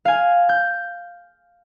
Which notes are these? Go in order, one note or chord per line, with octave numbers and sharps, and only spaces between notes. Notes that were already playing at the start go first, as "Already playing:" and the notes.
F5 G#5
G6